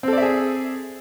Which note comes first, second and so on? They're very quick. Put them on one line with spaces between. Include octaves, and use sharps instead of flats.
C4 A4 D5 E5 G#4